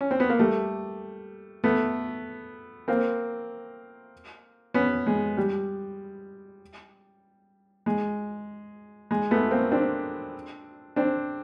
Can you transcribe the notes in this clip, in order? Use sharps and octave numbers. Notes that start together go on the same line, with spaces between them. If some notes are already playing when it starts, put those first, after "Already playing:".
C#4
C4
B3
A#3
G3 A3
A3 B3
A#3 C4
B3 C#4
G#3
G3
G#3
G#3
A3 B3
A#3 C4
C4 D4
C4 D4